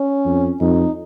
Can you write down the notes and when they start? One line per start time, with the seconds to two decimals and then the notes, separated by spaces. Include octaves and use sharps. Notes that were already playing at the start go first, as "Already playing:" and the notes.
Already playing: C#4
0.25 F2
0.60 F2 D#4